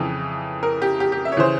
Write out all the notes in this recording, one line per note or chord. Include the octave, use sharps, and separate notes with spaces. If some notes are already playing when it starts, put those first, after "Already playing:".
Already playing: F2 C#3 E3
A#4
G4
G4
G4
E5
C#5
C#3 E3 C5